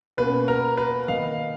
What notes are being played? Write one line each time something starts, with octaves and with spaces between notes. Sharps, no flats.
B2 A#3 C#4 B4
A#4
B4
D#3 A#3 D#4 F5